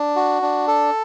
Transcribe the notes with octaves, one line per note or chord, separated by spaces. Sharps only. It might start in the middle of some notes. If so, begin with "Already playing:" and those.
Already playing: D4
F#4
D4
A4